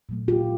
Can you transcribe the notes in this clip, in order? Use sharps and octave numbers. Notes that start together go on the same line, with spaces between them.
A#2 F#3 A3
F4 G4